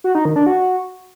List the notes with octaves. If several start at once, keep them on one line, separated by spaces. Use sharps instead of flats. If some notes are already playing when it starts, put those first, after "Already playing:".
F#4
D#4
D#3
D4
F#4